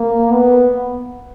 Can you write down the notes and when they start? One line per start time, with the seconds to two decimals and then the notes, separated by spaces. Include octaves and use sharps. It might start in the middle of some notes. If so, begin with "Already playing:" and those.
Already playing: A#3
0.32 B3